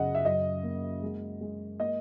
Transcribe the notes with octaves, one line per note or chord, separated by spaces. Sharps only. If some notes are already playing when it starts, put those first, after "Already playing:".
Already playing: F#2 C#3 D#5 F#5
E5
F#2 D#5
A#3
G#3
G#3
A#3 D#5